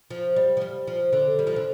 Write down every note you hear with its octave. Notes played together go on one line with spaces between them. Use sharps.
F3
G3
F3
G3
F3
D3
G3
F3
D3